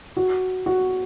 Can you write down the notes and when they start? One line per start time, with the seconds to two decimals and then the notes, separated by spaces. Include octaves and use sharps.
0.17 F#4
0.66 F#4